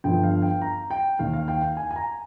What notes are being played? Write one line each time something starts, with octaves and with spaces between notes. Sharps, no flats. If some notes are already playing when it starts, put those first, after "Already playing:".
G1 G2 F3 G5
F5
G5
A#5
G5
D#2 D#3 F5
F5
G5
F5
G#5
G#5
A#5